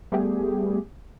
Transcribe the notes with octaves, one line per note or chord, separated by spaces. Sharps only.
G3 A3 B3 G4 G#4